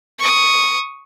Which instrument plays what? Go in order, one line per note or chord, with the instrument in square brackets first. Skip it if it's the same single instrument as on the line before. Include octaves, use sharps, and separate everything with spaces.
[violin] C#6 D#6